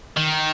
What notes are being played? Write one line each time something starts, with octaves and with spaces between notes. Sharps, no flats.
D#3